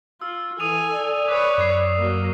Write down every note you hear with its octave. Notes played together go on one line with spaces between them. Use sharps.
F4 E6
E3 A4 G#5 D#6 D#7 F7
D5
B4 C#5 D6 D#6
F#2 D6 C7
F#3 A#3